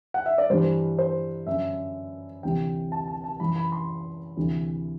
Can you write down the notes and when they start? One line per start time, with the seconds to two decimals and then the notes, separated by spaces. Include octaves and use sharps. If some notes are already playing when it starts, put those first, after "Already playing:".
0.14 F#5
0.26 E5
0.38 D5
0.50 G2 C5
0.53 E3
0.99 C5
1.47 F#2 D3 E5
2.43 D2 C3 E3 G5
2.92 A5
3.08 A5
3.24 A5
3.40 F#2 E3 B5
3.56 B5
3.72 C6
4.37 D2 C3 E3